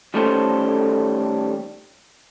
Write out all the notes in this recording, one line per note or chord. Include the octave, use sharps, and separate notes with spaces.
D#3 G3 A3 C#4 A4 C5